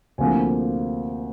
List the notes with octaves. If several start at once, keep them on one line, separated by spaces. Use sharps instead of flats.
D2 C3 F3 A#3 G#5